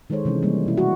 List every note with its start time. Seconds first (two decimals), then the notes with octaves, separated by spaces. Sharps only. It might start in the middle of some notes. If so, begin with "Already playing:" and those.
0.10 D#3 G#3 A4 C5 C#5
0.25 C3 E3 G#3 C#4
0.42 E3 G3 A#3
0.66 B2 E4
0.78 F#4